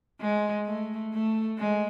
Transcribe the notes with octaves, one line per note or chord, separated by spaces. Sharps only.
G#3
A3
A3
G#3